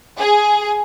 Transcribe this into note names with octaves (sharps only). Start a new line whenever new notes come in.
G#4